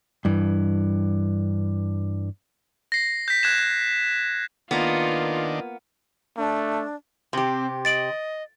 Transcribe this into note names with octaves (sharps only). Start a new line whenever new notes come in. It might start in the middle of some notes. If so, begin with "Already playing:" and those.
G2 E3
A#6 C7
G6 B6
F#6 G#6 E7
D#3 A#3 B3 D4 F4
A3 D4
C3 C4 G4
D#5 A6 D7 F#7